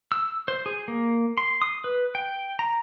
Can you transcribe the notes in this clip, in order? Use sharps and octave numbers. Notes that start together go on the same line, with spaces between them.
E6
C5
G#4
A#3
C6
D#6
B4
G5
A#5